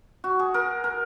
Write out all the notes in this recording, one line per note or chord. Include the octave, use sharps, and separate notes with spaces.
F#4
G#4
A#4
A#4